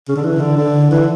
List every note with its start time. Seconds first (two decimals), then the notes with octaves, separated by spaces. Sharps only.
0.09 C#3
0.16 D3
0.24 E3
0.40 D3
0.57 D3
0.91 E3